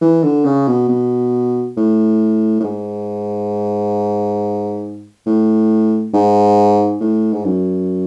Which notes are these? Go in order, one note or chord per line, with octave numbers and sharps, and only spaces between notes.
E3
D3
C#3
B2
B2
A2
A2
G#2
A2
G#2
A2
G#2
F#2